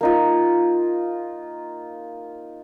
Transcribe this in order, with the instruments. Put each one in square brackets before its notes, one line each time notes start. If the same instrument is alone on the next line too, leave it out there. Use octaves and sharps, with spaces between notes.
[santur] A#3 D#4 F4